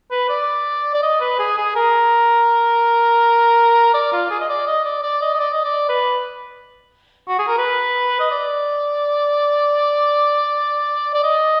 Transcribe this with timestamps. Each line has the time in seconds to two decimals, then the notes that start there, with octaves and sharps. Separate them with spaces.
0.11 B4
0.29 D5
0.94 D5
1.02 D#5
1.20 B4
1.39 G#4
1.57 G#4
1.76 A#4
3.94 D5
4.12 F4
4.30 G#4
4.40 D#5
4.49 D5
4.67 D#5
4.84 D5
5.03 D5
5.21 D#5
5.34 D#5
5.39 D5
5.53 D#5
5.64 D5
5.89 B4
7.28 F#4
7.39 G#4
7.48 A#4
7.58 B4
8.19 D#5
8.31 D5
11.14 D5
11.23 D#5